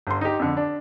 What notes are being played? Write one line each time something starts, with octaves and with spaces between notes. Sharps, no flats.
G1 C6
D#4 G4
F2 D3
D4